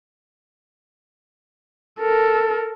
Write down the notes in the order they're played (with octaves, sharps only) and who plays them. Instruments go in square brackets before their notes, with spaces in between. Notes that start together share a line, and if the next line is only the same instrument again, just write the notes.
[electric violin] A4 A#4